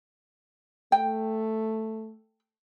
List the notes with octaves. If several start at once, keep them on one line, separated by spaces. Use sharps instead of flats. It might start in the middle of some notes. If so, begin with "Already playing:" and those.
A3 G5